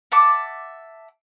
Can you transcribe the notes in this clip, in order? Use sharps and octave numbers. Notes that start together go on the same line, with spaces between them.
E5 F#5 A5 D6